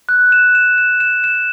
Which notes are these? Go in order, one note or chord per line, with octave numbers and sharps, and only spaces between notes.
F#6
E7
E7
E7
E7
E7